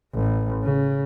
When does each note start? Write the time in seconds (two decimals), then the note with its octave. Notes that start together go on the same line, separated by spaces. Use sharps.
0.14 A1
0.63 C#3